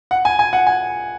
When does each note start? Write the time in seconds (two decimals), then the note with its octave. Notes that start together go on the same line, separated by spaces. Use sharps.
0.11 F#5
0.25 G#5
0.39 G#5
0.53 F#5
0.67 G#5